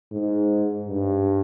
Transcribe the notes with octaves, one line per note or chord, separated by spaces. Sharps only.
G#2
G2